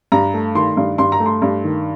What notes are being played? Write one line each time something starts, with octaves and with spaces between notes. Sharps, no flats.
G2 A#5
A3
D#3 C6
G2
G2 C6
A#5
A3
C6
G2
D#3